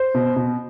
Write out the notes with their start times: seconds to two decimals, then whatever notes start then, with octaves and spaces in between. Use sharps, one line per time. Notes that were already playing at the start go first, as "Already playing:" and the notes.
Already playing: C5
0.14 B2
0.36 B2